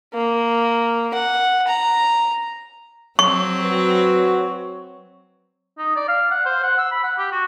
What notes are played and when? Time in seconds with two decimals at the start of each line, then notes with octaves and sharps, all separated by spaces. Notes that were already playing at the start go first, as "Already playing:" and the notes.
0.13 A#3
1.14 F#5
1.68 A#5
3.19 F#3 C4 C#5 C#6
3.61 F#4 B4
5.78 D#4
5.96 D5
6.08 F5
6.31 F#5
6.46 C5
6.63 F#5
6.78 E6
6.92 B5
7.03 F#5
7.18 G4
7.32 F#4